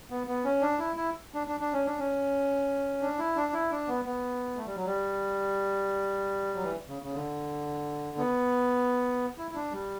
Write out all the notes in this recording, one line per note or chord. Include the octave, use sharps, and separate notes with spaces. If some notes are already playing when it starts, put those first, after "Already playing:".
B3
B3
C#4
D4
E4
E4
D4
D4
D4
C#4
D4
C#4
D4
E4
D4
E4
D4
B3
B3
A3
G3
F#3
G3
F#3
E3
C#3
C#3
D3
B3
E4
E4
D4
G3